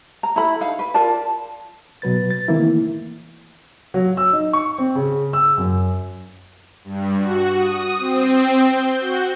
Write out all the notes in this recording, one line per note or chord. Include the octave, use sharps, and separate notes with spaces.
A#5
E4 A4 B5
D#4 F5
B4
F4 A#4 D5 A5
B2 F#3 B4 A6
A6
D#3 E3 A3 A#3 C4 E4
F#3
E6
D#4
C#6
C4
C#3
E6
F#2
G2
F#4
D#6
C4
G6
F#4